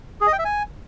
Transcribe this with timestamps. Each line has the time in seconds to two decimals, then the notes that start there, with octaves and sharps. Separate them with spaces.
0.21 G#4
0.27 D#5
0.33 G5
0.39 E5
0.45 G#5